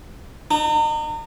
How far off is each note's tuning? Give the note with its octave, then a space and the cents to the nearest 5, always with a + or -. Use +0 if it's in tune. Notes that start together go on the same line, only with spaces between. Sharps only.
D#4 -40